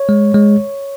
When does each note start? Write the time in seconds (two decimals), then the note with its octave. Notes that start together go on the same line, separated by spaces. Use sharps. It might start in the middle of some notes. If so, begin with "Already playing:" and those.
Already playing: C#5
0.09 G#3
0.34 G#3